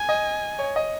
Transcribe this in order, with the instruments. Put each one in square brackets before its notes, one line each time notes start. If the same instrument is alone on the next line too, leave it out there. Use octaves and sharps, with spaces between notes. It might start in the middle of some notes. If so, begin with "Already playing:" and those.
Already playing: [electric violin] G#5
[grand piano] D#5
C#5
D#5